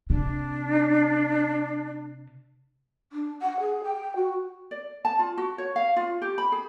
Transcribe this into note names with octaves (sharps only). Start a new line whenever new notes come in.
C3 D4
D4
F#5
G#4
G5
F#4
D5
A5
F4
F#4
C#5
F5
F4
G4
B5
G#4